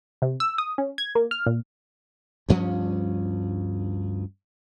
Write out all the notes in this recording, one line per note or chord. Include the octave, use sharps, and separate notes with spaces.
C3
E6
D#6
C#4
G#6
A#3
F6
A#2
D2 G2 F3 C#4